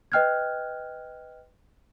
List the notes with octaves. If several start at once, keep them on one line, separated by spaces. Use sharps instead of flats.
B4 D#5 G5 F6 F#6 G#6